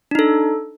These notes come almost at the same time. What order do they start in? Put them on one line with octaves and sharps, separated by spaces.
D4 D#4 A4